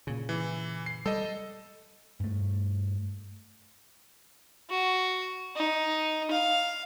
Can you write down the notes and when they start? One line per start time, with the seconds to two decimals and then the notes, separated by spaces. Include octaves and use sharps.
0.07 A#2 C#3
0.29 E3
0.86 C7
1.06 G3 A4 D#5
2.20 G2 A3
4.70 F#4
5.56 D#4
6.31 F5